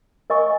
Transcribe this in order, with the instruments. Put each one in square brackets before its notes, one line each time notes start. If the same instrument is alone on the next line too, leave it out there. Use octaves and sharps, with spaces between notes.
[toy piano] A#4 D#5 G#5 C#6